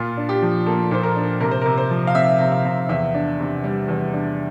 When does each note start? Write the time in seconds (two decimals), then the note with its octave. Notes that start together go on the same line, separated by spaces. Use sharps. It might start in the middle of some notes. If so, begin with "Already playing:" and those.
Already playing: A#2 F4
0.17 D4
0.29 G4
0.42 F3
0.66 A#3 A4
0.91 A#2 C5
1.03 A#4
1.16 D4
1.40 C3 A#4
1.51 C5
1.62 A#4
1.66 C3
1.78 C5
1.90 F3
2.07 F5
2.15 C4 E5
2.40 C3
2.52 F5
2.65 C3
2.89 E2 E5
3.14 D4
3.39 C3
3.64 G3
3.88 E2
4.13 D4